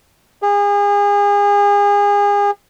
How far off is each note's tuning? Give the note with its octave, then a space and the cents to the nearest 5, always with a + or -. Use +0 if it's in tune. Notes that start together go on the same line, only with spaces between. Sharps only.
G#4 -35